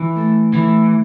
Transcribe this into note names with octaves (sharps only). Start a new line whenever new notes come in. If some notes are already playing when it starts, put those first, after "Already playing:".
Already playing: E3
A3
E3 A3